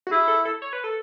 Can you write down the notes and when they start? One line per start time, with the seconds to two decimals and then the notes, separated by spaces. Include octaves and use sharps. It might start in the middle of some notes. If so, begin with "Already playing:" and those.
0.07 F#4
0.11 E4 G#4
0.28 A4
0.45 A4
0.62 C#5
0.73 B4
0.84 A4